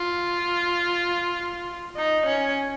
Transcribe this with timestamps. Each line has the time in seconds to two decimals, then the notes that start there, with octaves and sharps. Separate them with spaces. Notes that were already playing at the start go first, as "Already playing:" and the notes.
Already playing: F4
1.96 D#4
2.26 C#4